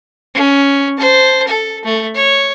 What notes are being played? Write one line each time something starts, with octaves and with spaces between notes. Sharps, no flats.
C#4
C5 A5
A4
A3
C#5